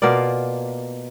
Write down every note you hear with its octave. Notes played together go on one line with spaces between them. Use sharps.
B2 A#3 F4 D5